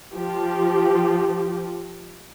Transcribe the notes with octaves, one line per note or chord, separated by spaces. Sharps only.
F3 G4